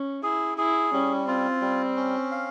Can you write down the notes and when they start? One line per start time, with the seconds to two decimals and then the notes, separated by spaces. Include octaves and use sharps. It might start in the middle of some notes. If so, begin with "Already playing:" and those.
Already playing: C#4
0.23 E4 G#4
0.58 E4 G#4
0.93 G3 C#4
1.27 C4 F4
1.61 G3
1.96 C#4
2.32 F5